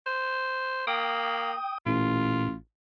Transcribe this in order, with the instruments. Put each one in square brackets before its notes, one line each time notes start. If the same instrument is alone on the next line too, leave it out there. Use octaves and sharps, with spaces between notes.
[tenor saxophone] C5
[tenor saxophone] A#3 [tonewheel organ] G5 D#6
[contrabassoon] A1 [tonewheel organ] A#2 [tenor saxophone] F4